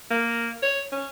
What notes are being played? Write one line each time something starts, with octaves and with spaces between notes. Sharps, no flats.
A#3
C#5
C#4